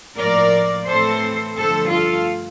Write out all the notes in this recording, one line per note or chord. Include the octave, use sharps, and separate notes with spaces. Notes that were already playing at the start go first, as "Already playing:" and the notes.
A2 F3 A#3 A#4 D5
A2 E3 A3 C4 A4 C5
G2 D3 F3 A3 A4 C5
F4 A4